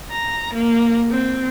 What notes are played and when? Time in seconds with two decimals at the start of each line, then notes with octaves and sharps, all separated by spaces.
0.11 A#5
0.54 A#3
1.11 C4